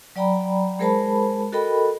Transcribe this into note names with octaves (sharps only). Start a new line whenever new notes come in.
F#3 D5 G5 A#5 B5
G#3 G#4 A#4 C5 A5 B5
F#4 A4 A#4 D#5 G5 B5